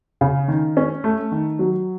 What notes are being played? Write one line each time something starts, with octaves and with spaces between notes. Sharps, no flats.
C#3
D#3
C#4
A3
D#3
F#3